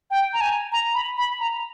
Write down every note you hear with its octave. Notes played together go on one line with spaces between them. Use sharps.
G5
A#5
G#5
A#5
B5
B5
A#5